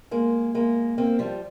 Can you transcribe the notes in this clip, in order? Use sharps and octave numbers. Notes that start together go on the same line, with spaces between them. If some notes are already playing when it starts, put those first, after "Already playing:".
G#3 A#3
G#3 A#3
A#3 C4
F3 G3